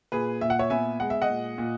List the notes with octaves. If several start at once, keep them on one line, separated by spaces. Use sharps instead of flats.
A#2 G#4 B4
A#2 E5
F#5
C#5 E5
B3 E5 G#5
G#3 F#5
E5
D#5 F#5
A#2
A#2